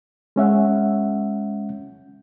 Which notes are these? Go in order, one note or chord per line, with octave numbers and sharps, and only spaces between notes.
G#3 C#4 E5 F#5